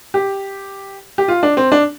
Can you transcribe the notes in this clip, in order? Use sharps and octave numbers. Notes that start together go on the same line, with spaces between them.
G4
G4
F4
D4
C4
D4